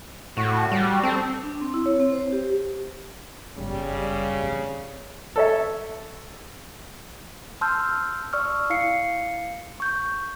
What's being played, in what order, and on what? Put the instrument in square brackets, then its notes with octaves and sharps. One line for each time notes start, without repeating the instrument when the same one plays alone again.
[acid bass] A2 [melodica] F#4
[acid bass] G3
[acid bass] C4 [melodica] A4
[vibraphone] D4
C4
E4
C#5
C4
C5
G4
[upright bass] G1 F#2 [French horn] C#3 [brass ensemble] G3
[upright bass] A3 C4
[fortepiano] A4 C#5 E5
[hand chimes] A5 C6 E6 F6 G6
D5 C#6 E6 F6
E4 F5 C7 C#7
C#6 G6